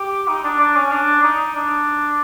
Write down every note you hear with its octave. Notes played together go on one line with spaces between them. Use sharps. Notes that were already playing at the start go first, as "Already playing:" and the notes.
Already playing: G4
D#4
D4
D4
C#4
D4
D#4
D4